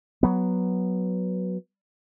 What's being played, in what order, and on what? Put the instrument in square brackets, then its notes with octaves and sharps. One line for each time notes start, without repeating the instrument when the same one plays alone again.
[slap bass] F#3 B3